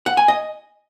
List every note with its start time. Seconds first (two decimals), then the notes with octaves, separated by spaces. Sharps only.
0.06 F#5
0.17 G#5
0.28 D#5